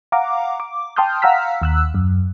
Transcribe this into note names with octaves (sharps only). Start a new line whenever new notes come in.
F5 F#5 A#5 D6
D6
G5 A5 C6 D#6 F6 G6
F5 F#5 A#5 E6 F6 B6
D#2 E6 F#6
F#2